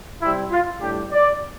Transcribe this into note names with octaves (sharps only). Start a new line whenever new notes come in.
C3 G3 C4 E4
F4
A2 G3 D4 G4
D5